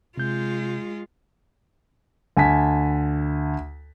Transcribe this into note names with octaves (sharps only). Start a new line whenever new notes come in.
C3 G#3 F4 G6
D2 G#5 A5 B6